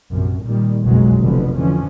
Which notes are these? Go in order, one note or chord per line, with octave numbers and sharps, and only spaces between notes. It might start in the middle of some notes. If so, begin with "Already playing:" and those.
A#1 F#2 C3
A#2 D#3 G3
F#1 B1 F2 B2 F#3 G#3
F1 D3 F3 B3
D3 E3 F3 C#4